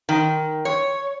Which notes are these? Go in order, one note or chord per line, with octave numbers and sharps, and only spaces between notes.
D#3
C#5